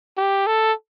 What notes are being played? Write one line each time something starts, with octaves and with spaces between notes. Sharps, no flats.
G4
A4